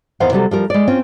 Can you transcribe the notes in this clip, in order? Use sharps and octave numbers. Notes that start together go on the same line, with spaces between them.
E2 D#3 C5 F5 F#5
C3 F#3 G3 A4
F3 G3 A#4
G#3 D5
C4 C#4 F4